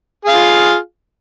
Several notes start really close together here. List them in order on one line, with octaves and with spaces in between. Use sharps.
G#4 F5 F4